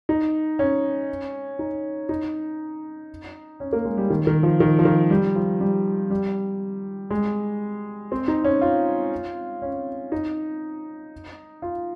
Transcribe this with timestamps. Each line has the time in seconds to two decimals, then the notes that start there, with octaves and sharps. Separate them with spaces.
0.09 D#4
0.59 C#4
1.59 D#4
2.09 D#4
3.60 C#4
3.73 A#3
3.85 G#3
3.97 G3
4.10 D#3
4.27 D#3
4.43 F3
4.60 D#3
4.79 F3
4.85 D#3
5.10 G3
5.36 F3
5.60 G3
6.10 G3
7.10 G#3
8.12 C4
8.28 D#4
8.44 C#4
8.61 F4
9.62 C#4
10.12 D#4
11.62 F4